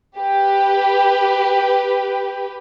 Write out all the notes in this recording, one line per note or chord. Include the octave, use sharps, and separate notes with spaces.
G4 B4